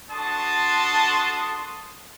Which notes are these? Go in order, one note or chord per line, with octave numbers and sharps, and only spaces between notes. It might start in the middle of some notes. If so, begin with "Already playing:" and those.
D4 F#4 A4 A5 C6 D#6